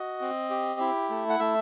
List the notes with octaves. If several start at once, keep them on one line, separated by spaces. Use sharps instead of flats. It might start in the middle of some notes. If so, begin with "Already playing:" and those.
Already playing: F#4 D#5
C4
G4
E4
A3
F#5
A3 E5